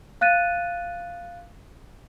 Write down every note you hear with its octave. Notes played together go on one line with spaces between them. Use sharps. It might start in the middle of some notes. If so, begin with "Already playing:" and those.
F5 F#6 A6 D#7